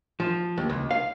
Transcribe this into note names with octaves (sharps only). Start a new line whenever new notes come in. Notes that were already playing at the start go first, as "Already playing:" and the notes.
F3
D#2
C#2
F5